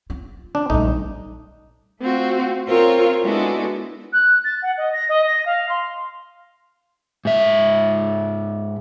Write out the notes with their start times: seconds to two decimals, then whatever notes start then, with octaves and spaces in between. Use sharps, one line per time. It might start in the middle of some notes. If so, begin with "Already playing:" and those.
0.10 F4
0.55 D4
0.70 A#1 G3 A3 D#4
2.00 A3 C4 F4 F#4
2.67 C4 F4 A#4 C5 C#5
3.24 G#3 B3 D4 E4 F#4 A4
4.13 F#6
4.44 A6
4.62 F#5
4.77 D#5
4.93 A#6
5.09 D#5
5.27 A#6
5.46 F5
5.69 C6
7.25 G#2 E5